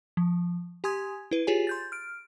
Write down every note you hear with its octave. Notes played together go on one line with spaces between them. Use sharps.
F3
G4 G#5 C6 D#6 G#6
E4 B4
F4 G4 G#4 C#5 G#5
C6 G6 A6
F6 D7